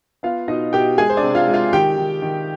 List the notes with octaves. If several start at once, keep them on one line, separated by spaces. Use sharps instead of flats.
B3 F4 F5
B2 D#4 D#5
B2 G4 G5
G#3 G#4 G#5
C5
D4 D5
C3
F4 F5
G#3
F4 F5
D#3 G4 G5
D#3
D#3